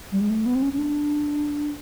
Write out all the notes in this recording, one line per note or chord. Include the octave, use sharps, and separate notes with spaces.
G3
G#3
A3
B3
C4
C#4
C#4
D4